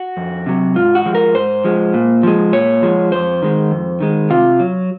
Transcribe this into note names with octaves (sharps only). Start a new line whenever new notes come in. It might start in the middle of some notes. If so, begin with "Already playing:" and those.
Already playing: F#4
F2
C3 F#3
G#2 F4
F#4
F3 G#3
A#4
G#2 C5
F3 G#3
A#2
F3 G#3
A#2 C#5
F3 G#3
F2 C5
D#3 G#3
F2
D#3 G#3
C3 F4
F#3